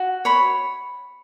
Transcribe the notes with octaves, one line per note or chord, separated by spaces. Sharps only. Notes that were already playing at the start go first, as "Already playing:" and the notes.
Already playing: F#4
C#5 B5